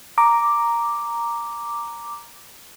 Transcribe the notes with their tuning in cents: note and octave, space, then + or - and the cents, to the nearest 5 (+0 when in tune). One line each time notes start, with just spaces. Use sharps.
A#5 +0 D6 +0